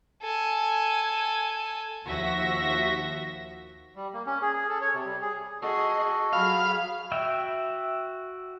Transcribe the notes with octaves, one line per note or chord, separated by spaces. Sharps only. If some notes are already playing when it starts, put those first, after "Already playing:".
A4 G#5
D#2 F3 F#4 E5 A#6
G3
A#3
C#4
G#4
G#4
A4
C#5
C3
G3
G#4
F#4 G#4 A4 D#5
F#3 G#4 F5 B5
F#4 E5 G5